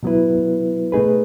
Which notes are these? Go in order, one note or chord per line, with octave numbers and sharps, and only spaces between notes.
B2 F#3 B3 E4 B4
B2 A3 D#4 G#4 B4